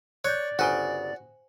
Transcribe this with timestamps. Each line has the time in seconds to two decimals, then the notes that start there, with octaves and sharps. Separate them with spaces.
0.25 C#5 D5 F#6 G6
0.59 G1 C#3 F#4 C5 G5 G#5